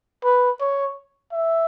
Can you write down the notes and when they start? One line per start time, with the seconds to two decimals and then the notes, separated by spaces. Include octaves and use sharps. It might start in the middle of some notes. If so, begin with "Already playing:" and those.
0.24 B4
0.60 C#5
1.33 E5